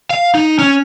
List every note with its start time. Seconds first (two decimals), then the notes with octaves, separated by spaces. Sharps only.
0.10 F5
0.35 D#4
0.59 C#4